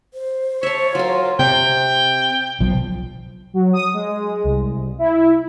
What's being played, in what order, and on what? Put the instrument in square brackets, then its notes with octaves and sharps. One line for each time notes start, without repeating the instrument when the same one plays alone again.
[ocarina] C5
[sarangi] C#5 [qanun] E5 A5
[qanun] F#3 A#4 [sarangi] F4
[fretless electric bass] C3 [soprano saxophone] G5
[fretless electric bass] B1 F3
[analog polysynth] F#3
D#6
G#3
C2
E4